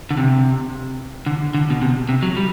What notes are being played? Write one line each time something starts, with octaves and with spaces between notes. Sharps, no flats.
D3
C3
D3
D3
B2
C3
C3
F#3
G3